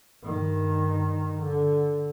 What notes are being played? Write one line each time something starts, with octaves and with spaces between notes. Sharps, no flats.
G2 D#3
D3